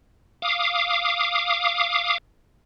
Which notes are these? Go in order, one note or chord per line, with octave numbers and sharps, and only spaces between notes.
F5 D6 D#6